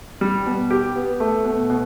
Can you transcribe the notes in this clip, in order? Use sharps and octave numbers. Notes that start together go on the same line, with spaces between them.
G3
B2
G4
B3
A3
B2
B2